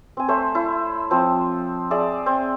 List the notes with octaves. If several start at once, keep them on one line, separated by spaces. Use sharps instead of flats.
C4 G#5
A3 C5 C#5 E5
E4
F3 C4
G#4 D5 E5
C4